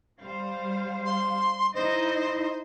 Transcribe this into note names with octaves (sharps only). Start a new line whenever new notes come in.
G3 C5 F5
C6
D#4 E4 C5 D#5